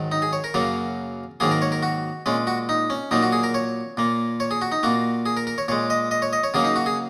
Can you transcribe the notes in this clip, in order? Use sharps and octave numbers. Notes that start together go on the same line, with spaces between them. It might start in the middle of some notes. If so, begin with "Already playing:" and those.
Already playing: G#2 D#3 F#3
D#4
G#4
C#5
A#4
F#2 C#3 F#3 A#3
G#2 D#3 F#3 A#3 G#4
A#4
C#5
A#4
F#4
A#2 G#3 C#4
F#4
D#4
C#4
A#2 F#3 A#3 D#4
F#4
G#4
A#4
C#5
A#2 A#3
C#5
G#4
F#4
D#4
A#2 A#3 F#4
G#4
A#4
A#4
C#5
A#2 G#3 C#5
D#5
D#5
C#5
D#5
C#5
C#3 F#3 A#3 G#4
D#4
F#4
G#4